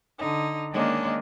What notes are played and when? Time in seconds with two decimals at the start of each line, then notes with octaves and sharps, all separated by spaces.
0.19 D3 D#4
0.73 D#3 G#3 A#3 C#4 D4